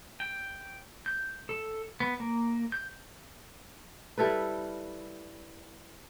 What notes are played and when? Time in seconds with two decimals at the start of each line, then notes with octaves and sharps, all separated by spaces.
0.20 G5
1.06 G6
1.49 A4
2.00 B3
2.20 A#3
2.72 G6
4.18 G3 E4 A4 B4